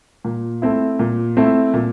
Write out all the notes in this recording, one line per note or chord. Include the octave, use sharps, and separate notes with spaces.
A#2
A3 C4 E4
A#2
A3 C4 E4
A#2